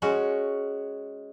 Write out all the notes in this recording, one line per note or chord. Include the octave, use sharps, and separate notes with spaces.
G#3 C#4 F#4